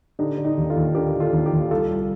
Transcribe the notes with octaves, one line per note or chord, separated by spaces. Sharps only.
D3 D#4 G4
D3
D#4 G4
D#2
F4 A4
D#2
D3 G4 A#4
D3
F4 A4
D#2
D#4 G4
D#2
C2 F4 A4
C2